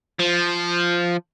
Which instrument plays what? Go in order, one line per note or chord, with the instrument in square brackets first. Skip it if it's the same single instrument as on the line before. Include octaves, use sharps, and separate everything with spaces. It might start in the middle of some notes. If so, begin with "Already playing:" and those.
[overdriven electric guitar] F3